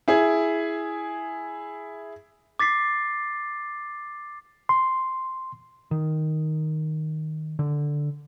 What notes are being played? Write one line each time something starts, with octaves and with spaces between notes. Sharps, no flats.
E4 G#4
D6 A6 B6 C7
C6
D#3
D3